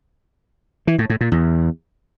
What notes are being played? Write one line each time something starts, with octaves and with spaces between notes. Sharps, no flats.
E3
A2
A2
A#2
E2